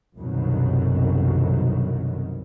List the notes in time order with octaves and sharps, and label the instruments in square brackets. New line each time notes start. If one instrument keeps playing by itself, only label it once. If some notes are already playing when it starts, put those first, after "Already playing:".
[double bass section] C2 F#2 B2 D3 D#3 F#3